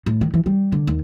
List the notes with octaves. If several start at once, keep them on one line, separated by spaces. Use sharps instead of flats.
A2
D#3
E3
G3
D3
D#2